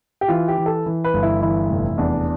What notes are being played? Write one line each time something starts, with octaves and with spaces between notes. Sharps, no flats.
G4
E3 F4
G4
E3
A4
E3
B4
G1
E4
E3 E4
F1
E2 D4